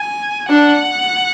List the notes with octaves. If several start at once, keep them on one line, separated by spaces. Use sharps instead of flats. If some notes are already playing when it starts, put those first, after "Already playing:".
Already playing: G#5
D4 F#5